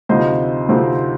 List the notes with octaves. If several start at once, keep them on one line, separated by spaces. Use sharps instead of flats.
D2 C3 F3 C4 D#4 C5 D#5
D2 C3 F3 C4 D#4